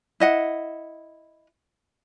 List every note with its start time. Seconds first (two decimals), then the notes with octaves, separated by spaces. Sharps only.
0.20 E4 D#5 F#5